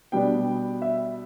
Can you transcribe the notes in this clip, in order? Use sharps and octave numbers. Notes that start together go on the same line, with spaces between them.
B2 G3 B3 D4 G5
E5